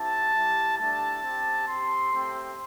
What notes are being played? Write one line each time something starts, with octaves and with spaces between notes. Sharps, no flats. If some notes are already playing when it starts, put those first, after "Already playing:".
Already playing: C4 E4 G4 A5
G3 E4 G4
A3 D4 G4 A5
C4 G4
C4 G4 C6
A3 C4 G4